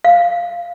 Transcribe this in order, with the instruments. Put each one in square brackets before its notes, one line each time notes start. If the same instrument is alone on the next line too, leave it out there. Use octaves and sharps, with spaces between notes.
[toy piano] F5